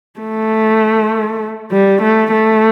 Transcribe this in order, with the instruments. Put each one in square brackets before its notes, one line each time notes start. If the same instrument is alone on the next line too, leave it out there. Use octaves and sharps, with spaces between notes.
[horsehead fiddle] A3
G3
A3
A3